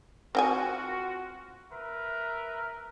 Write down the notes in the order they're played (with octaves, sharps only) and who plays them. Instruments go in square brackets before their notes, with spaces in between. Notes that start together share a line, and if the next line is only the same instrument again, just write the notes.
[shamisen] C4 G5 G#5 [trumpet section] F4 F#4
[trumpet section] A#4 B4 E5